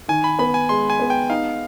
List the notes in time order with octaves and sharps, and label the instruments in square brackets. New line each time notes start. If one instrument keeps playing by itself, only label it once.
[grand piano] D#3 [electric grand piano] G#5
[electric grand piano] B5
[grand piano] B3 [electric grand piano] B5
[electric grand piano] G#5
[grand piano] G#3 [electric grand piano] C6
[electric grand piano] G#5
[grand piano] B3
[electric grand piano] G5
[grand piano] D#4 [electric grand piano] F5